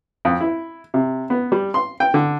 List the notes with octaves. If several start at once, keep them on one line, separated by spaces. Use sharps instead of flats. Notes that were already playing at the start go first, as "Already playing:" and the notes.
F2
E4
C3
B3
G3
C6
G5
D3